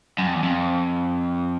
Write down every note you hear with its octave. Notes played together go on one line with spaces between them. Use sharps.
F#2
F2
E2
F2